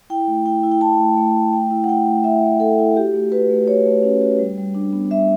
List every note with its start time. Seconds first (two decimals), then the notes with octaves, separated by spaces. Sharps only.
0.10 E4 G5
0.28 A3
0.46 E4 G5
0.63 E4
0.71 G5
0.81 E4 A5
0.99 A3
1.17 A3
1.35 A3
1.53 A3 G5
1.71 E4
1.84 F#5
1.89 A3 G5
2.07 A3
2.24 E4 E5
2.43 A3
2.60 E4 A4
2.79 E4
2.96 F#4 G4
3.14 A3
3.32 F#4 B4
3.50 A3
3.67 F#4 C#5
3.86 A3
4.03 C#4
4.22 F#4
4.39 G3
4.58 G3
4.75 D4
4.93 B3
5.10 G3 E5